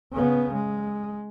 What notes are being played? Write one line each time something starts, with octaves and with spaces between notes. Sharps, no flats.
C#3 B3
G#3